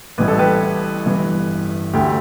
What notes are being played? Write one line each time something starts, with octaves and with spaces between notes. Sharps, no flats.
A1 A2 E3 G3 B4
A4
G4 B4
G1 G2 E3
D2 D3 A3 G4